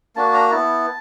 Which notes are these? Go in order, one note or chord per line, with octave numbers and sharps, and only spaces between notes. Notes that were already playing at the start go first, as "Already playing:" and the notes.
A#3 D4 F#4 A5
A#5
B3 E4 A5